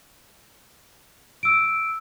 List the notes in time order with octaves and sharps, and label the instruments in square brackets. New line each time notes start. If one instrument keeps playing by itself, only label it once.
[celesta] E6 D7